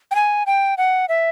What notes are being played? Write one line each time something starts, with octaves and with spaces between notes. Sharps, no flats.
G5
G#5
G5
F#5
E5